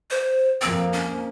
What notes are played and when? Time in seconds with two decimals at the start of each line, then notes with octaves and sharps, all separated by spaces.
0.11 C5
0.62 F2 F3 A#3 C4
0.93 C#4